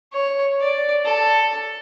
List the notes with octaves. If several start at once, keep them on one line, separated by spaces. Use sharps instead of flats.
C#5
D5
A4